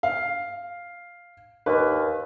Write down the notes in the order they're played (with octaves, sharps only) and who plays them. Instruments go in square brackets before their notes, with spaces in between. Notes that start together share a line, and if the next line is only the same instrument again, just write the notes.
[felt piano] F5
[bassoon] D#2 [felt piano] B4